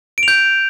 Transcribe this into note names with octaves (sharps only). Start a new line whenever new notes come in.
D7
F7
G6